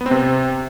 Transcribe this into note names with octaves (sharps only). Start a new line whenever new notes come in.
B3
C4
C3